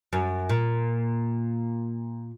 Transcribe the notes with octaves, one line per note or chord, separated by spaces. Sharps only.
F#2
A#2